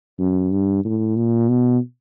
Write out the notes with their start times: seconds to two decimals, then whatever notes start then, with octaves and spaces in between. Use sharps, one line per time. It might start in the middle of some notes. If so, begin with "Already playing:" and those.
0.19 F#2
0.51 G2
0.85 A2
1.16 A#2
1.49 B2